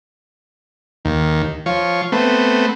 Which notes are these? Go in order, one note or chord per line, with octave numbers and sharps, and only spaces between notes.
D#2
F3 C#5
A3 B3 C4